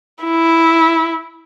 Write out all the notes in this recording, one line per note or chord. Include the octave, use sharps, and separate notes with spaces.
E4